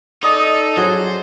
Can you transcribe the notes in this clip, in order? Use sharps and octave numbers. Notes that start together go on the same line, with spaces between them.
D#4 A4 D5 D#5 D#6
F#3 G#4 C5